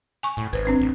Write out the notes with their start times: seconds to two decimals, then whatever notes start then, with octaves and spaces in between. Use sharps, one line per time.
0.23 G#5 C#6
0.37 A2
0.53 G#1 B4 C5
0.65 C4 D4 B4
0.80 A1